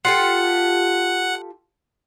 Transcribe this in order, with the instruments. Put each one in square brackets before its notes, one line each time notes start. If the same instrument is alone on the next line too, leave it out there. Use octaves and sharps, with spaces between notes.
[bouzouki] F4 G4 A4 [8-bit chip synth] F#5